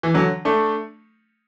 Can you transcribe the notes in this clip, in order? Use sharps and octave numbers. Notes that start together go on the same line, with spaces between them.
E3
D3 F#3
A3 D4